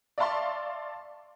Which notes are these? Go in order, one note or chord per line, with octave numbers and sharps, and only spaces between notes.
D5 E5 F5 A5 C6 C#6